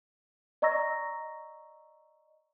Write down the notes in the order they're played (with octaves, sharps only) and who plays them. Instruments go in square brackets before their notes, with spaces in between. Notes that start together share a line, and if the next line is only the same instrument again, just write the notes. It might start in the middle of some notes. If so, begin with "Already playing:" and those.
[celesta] D5 D#5 A#5 C#6 E6 A#6